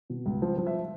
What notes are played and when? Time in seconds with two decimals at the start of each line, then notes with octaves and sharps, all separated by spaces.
0.10 B2
0.26 C#2
0.42 F3
0.58 F3
0.67 E5